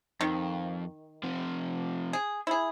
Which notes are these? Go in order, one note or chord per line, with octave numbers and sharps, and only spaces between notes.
F2 D#3
C3 F3
G#4
E4 G#4